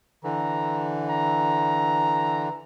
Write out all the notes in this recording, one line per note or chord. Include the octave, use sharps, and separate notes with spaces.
D3 E3 A#5
A#5